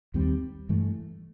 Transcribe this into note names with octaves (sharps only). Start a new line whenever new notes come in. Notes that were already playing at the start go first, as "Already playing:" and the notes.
D#2 D#3 G3 C4
G2 E3 A3